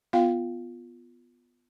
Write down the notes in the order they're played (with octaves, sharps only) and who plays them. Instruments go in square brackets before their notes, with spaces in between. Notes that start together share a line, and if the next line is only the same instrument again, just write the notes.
[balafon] B3 F4 F5 G5